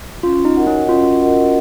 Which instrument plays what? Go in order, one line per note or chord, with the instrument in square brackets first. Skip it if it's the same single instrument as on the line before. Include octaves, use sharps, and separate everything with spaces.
[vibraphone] C#4 [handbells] F4
[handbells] D#4
[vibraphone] F#4 A#4 D#5 F#5
[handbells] C#4
[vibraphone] C#4 [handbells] F4
[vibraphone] F#4 A#4 D#5 F#5